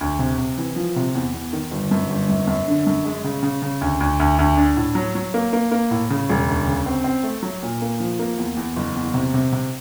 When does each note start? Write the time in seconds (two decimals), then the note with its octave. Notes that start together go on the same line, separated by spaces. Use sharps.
0.01 D2
0.19 C3
0.38 C3
0.58 E3
0.76 F3
0.96 C3
1.15 E2
1.34 E2
1.53 D#3
1.71 G1
1.91 F#2
2.10 G1
2.30 F#2
2.47 F#2
2.68 D3
2.87 F#2
3.05 G#3
3.24 C#3
3.43 C#3
3.62 C#3
3.81 D2
4.00 D2
4.20 D2
4.38 D2
4.57 D4
4.76 A2
4.95 F#3
5.15 F#3
5.34 A#3
5.53 A#3
5.71 A#3
5.91 A2
6.10 C#3
6.29 E1
6.48 D2
6.67 C#3
6.86 C4
7.04 C4
7.23 A3
7.43 F#3
7.63 A#2
7.82 A#3
8.00 F3
8.19 A#3
8.38 E2
8.57 E2
8.76 F#1
8.96 E2
9.14 C3
9.34 C3
9.52 C3